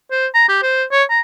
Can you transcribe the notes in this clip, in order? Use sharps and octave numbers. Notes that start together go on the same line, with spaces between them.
C5
A#5
G4
C5
C#5
A#5